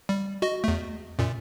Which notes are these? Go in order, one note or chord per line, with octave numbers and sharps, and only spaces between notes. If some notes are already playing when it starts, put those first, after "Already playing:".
G3
F#4 D#5
E2 A3
F#2 A#2